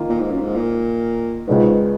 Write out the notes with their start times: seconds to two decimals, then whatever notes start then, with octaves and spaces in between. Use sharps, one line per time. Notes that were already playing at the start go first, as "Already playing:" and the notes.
Already playing: D#3 A#3 F4
0.10 A#2
0.20 G#2
0.31 F#2
0.41 G#2
0.56 A#2
1.47 C#2 G#2 C#3 G#3 B3